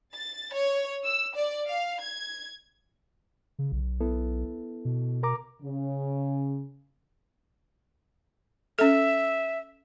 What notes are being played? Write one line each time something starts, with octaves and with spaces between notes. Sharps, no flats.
A6
C#5
E6
D5
F5
G#6
C#3
B1
B3 E4 A4
B2
A#4 A#5 D6
C#3
C#4 A4 E5